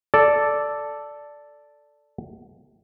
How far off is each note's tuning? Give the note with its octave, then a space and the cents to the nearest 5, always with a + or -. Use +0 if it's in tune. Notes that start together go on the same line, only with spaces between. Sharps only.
A4 +0 D5 +0